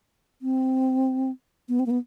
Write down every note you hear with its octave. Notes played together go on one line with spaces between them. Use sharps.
C4
B3
C4
A#3
B3